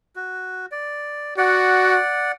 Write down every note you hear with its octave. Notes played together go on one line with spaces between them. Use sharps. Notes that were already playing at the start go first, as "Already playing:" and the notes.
F#4
D5
F#4 D5 F#5